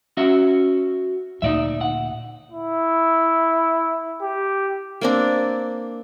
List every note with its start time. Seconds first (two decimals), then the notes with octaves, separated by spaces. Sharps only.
0.17 C#4 F#4 E5
1.42 D2 A#2 D#4 D5 E5
1.81 F#5
2.52 E4
4.22 G4
5.01 A#3 C4 D4